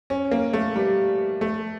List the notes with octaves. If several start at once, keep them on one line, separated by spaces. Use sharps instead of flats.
C#4
A#3
A3
G3
A3